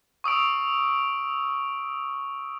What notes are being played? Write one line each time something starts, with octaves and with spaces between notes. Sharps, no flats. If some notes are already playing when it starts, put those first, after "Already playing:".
C#6 D#6 E6 D7